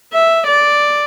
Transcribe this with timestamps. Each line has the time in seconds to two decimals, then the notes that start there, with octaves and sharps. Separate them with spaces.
0.13 E5
0.47 D5